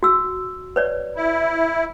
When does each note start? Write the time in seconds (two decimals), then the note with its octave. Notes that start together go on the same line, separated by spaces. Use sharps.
0.03 F#4 E6
0.76 B4 C#5 D5
1.16 E4